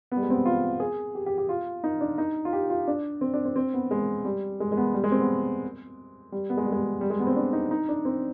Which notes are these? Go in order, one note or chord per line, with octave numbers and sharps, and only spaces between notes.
B3
G3
G#3
C4
B3
F4
G#4
G4
G4
G4
F4
D#4
D4
D#4
F4
G4
F4
D4
C4
D4
C4
C4
B3
G#3
G3
G#3
G#3
B3
G3
G#3
C4
B3
G3
B3
G#3
G3
G#3
G3
G#3
B3
C4
D4
D#4
D#4
D4
C4